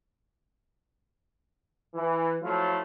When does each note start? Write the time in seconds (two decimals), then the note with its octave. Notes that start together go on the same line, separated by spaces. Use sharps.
1.95 E3
2.42 F3 F#3 A3 E4 F4